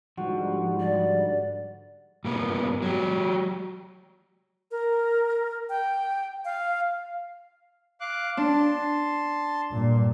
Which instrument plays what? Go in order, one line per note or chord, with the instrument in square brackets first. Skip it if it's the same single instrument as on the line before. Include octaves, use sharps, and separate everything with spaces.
[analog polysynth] G#2 D3 G3 [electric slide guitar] F3 [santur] F#4
[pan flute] D5
[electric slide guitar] G2 A#3 B3
F#3 G4
[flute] A#4
G5
F5
[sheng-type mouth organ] F5 D6 F#6
[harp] D4 [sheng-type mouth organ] A5 C6
[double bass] G2 A#2